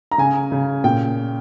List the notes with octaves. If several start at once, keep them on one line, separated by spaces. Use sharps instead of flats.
A#5
C#3 G#5
C#3
A#2 G5